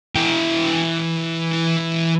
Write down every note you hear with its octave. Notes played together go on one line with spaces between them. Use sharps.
E3 G5